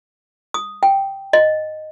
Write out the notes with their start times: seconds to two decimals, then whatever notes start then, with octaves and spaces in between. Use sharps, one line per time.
0.54 D#6
0.83 G5
1.33 D#5